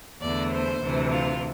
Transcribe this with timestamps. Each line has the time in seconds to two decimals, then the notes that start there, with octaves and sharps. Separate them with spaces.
0.21 E2 D3 A3 D5
0.52 C5
0.82 D2 C3 E3
1.12 F4